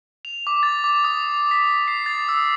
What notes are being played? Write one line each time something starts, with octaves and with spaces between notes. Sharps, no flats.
F7
D6
A6
D6
D#6
B6
C7
A6
E6